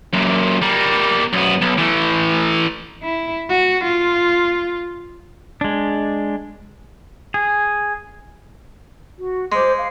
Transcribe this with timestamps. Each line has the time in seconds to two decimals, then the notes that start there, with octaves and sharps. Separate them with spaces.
0.14 F#2 A#2
0.62 G3 A#3
1.33 F#2 B3
1.62 B1
1.78 E3 A3
3.03 E4
3.49 F#4
3.85 F4
5.61 G#3 D4
7.34 G#4
9.18 F#4
9.52 G#3 C5 D6
9.78 F5